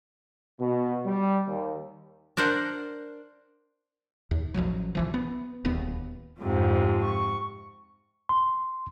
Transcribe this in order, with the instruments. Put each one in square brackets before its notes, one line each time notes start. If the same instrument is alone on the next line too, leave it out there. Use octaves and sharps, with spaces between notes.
[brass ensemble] B2
G3
D#2
[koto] D4 A#4 C5 D5 F#5
[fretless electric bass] D#2
A1 G#2 F3 F#3
B1 E3 F3
B3
D1 D#2 B3
[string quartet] F2 G#2 C3 F3
C#6
[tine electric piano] C6